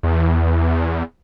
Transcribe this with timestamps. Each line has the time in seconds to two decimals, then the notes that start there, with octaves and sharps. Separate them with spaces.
0.03 E2